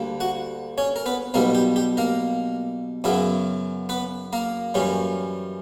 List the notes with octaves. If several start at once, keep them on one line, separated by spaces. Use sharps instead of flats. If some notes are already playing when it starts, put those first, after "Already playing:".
Already playing: D2 D3 G3 A#3
F#4 F#5
C#4 C#5
A#4
B3 B4
B1 B2 G3 A#3 B3 A#4
G4
G4
A#3 A#4
F#2 C#3 F#3 B3 E4
B3 B4
A#3 A#4
F#2 E3 G3 C#4